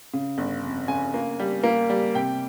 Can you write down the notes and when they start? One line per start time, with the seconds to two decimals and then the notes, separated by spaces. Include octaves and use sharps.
0.13 C#3
0.38 G1
0.63 F2
0.88 C#3 G#5
1.14 A#3
1.39 G3
1.63 A#3
1.90 G3
2.15 C3 G5